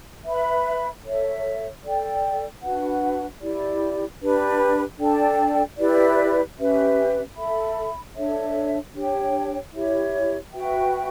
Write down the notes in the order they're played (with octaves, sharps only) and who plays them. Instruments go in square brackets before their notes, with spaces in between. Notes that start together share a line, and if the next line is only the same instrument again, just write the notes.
[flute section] B4 E5 B5
A4 C#5 E5
A4 D5 G5
D4 F#4 B4 F#5
E4 G4 D5
D4 G4 B4
D4 A4 D5 G5
E4 G4 B4 D5
C#4 G4 B4 E5
A4 E5 B5
D4 A4 C#5 E5
D4 G4 C#5 G5
E4 G4 C#5 E5
F#4 B4 E5 G5